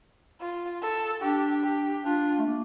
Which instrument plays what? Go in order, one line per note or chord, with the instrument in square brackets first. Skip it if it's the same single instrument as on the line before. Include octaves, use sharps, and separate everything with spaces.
[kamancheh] F4
A4
[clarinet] D4 [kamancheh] G4
[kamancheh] G4
[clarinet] D4 [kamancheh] F4
[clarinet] A3
A#3